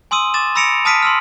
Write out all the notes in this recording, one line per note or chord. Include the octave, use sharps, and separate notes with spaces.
G#5 C6 D#6 E6 D#7
D6 A6 E7
B5 E6 A#6 C#7 D7 F7
A5 D#6 F6 B6 D7 D#7
C6 E6 F6